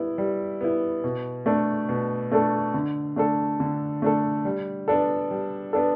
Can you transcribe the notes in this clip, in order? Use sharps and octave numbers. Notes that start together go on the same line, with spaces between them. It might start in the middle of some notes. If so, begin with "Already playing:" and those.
Already playing: G3 B3 E4
G3
B3 E4
B2
A3 D4 A4
B2
A3 D4 A4
D3
A3 D4 A4
D3
A3 D4 A4
G3
B3 D4 A4
G3
B3 D4 A4